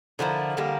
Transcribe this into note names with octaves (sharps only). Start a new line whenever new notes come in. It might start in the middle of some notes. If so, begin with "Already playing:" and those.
D3 F3 A#3 E4
D3 G3 A#3